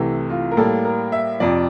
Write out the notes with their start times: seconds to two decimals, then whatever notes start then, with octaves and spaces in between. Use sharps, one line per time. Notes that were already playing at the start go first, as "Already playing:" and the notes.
Already playing: C2 C3 E3 A3
0.29 F4
0.51 A#4
0.57 A2 G3 A#3 A4
0.85 A#4
1.12 E5
1.40 F2 C3 F3 D5